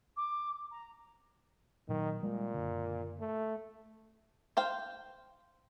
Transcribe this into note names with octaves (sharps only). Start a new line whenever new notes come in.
D6
A#5
A#2 D#3 F#3
A#2 G3 G#3 A#3
F#1 D3
A3
C5 F5 G5